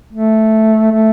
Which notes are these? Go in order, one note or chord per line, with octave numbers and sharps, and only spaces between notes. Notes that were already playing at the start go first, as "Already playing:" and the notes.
A3
A3